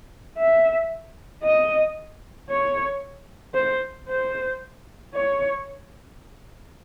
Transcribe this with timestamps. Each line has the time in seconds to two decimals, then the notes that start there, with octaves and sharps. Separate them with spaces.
0.37 E5
1.43 D#5
2.49 C#5
3.54 C5
4.08 C5
5.14 C#5